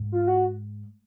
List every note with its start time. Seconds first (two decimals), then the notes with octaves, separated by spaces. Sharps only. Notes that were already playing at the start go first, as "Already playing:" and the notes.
Already playing: G#2
0.12 F4
0.27 F#4